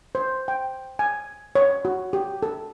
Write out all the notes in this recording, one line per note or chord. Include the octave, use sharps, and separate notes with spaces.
C5
G5
G#5
C#5
F#4
G4
A4